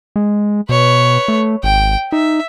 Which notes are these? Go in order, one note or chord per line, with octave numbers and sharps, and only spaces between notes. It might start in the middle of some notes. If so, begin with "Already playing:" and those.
G#3
B2 B4 C#5
A3
G#1 G5
D#4 E5